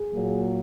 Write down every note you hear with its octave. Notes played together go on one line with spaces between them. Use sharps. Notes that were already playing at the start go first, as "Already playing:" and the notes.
Already playing: G#4
A#2 F#3 A#3